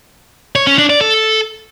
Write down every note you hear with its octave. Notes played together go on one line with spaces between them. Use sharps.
C#5
C#4
D4
D5
A4